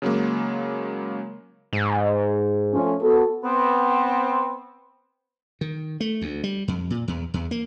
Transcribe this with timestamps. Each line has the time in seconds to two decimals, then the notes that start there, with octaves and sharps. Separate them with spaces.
0.02 C#3 F#3 G#3 A#3
1.73 G#2
2.73 F3 A3 C#4
3.02 B3 F#4 A4
3.43 B3 C4
5.61 D#3
6.00 A3
6.21 D2
6.44 G3
6.68 F2
6.90 A#2
7.08 E2
7.34 E2
7.51 A#3